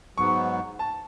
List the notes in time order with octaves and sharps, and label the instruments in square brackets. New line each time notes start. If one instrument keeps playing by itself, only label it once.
[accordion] G#2 F#3 B3 [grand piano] C#6
[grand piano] A5